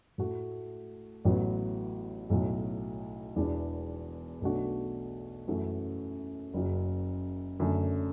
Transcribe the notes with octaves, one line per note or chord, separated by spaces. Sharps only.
A2 A3 F#4
A1 A2 F#3 B3
B1 A2 F#3
E1 E2 E3 D4
B1 B2 A3 D4 F#4
F#2 E3 A3 F#4
F#1 F#2 F#3
F#1 F#2 D3 A3